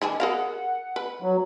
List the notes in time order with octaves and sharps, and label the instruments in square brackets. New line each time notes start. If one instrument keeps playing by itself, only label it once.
[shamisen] D#3 D4 G#5
[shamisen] G#4 A#4 F5 [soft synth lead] F#5
[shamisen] B4
[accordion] F#3